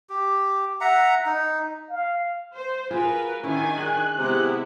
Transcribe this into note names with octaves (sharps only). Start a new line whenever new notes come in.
G4
E5 F#5 A#5
D#4
F5
C5
F4 F#4 G#4 A#4 B4
D#3 C#4 D4 E4 G#5
G#4 F#6
C3 G#3 B3 E4